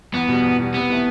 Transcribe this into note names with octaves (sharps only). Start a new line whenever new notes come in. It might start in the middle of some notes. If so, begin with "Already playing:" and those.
E2 B3
B2 G3
E2
B2 G3
C3 B3
E3 A3